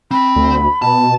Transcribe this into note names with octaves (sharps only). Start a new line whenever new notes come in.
C4 B5
D2
B2 A5